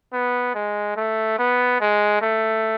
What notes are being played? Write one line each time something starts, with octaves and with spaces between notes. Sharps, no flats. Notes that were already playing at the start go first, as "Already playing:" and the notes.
B3
G#3
A3
B3
G#3
A3